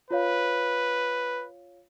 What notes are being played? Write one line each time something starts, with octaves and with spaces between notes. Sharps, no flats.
F4 B4 C#5 F5